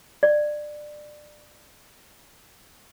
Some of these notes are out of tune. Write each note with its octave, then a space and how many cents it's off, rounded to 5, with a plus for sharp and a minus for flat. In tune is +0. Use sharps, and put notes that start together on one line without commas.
D5 +20